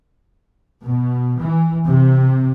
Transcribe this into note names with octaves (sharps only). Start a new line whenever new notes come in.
B2
E3
C3